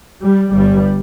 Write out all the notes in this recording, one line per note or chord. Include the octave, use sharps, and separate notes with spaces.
G3
G1 G2 G3